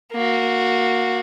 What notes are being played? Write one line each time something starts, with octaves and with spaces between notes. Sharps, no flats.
A#3 F#4